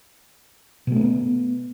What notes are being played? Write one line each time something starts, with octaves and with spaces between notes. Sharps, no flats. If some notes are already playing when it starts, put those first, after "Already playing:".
B2 A3 B3 C4